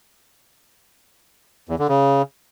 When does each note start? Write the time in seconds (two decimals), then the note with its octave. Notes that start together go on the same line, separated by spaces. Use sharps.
1.69 E2
1.79 D3
1.88 C#3